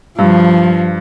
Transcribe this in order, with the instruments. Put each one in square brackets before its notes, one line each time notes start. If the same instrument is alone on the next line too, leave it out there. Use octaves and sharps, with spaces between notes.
[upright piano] G2 [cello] F3